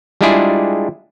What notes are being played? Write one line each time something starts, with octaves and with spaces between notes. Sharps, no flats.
G3 G#3 D4 E4 F4 G#4